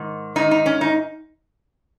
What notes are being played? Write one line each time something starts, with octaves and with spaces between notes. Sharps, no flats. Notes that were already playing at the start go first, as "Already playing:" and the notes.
Already playing: G#2 D#3
G#2 D#3 D#4
D#4
C#4
D#4